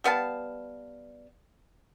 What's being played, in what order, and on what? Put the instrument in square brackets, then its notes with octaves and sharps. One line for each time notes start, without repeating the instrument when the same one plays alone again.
[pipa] G3 B3 F5 A5